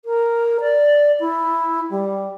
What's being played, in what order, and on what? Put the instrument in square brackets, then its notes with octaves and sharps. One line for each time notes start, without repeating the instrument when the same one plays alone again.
[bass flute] A#4
D5
E4
G3